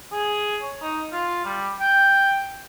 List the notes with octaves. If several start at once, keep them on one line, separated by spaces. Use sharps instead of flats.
G#4
C#5
D#4
F4
G3
G5